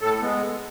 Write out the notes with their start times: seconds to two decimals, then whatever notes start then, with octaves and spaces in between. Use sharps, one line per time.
0.01 A2 A4
0.21 G#3 B3